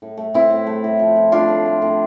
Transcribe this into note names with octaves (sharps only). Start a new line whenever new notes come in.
A2
A3
A2 C4 E4
A2
A3
A2
F3
F3
A3 D4 F4
A2
A3
A2